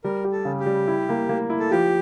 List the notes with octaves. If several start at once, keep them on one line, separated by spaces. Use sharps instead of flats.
G3 A#4
G4
A4
C#3
G4
G3
E4
A#3
A#3
E4
A4
F3 G4